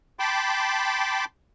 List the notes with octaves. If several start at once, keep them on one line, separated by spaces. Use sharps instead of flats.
G5 A5 B5 C6 D6